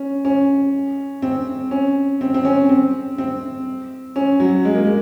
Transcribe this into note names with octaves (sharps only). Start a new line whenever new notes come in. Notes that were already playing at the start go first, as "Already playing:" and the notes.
Already playing: C#4
C#4
C4
C#4
C4
C4
C#4
C4
C4
C#4
F#3
G#3
A#3
G#3